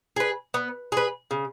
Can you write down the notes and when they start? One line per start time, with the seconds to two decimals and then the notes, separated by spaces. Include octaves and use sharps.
0.16 G#4 B4
0.54 B3
0.92 G#4 B4
1.31 C#3